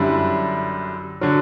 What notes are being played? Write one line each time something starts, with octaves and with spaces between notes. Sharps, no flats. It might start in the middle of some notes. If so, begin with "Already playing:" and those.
Already playing: F#2 D3 G3 E4
D3 F#3